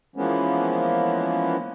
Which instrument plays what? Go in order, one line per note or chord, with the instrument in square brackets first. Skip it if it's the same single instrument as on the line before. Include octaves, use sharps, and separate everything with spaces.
[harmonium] E3 F3 G#3 A#3 B3 C#4